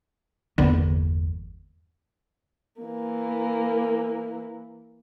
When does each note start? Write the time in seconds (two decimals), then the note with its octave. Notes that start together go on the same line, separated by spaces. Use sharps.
0.58 G1 E2 D3 A#3 B3
2.81 E3 A#3